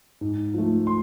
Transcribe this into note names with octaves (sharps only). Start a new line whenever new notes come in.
G#2
F3 A3
C6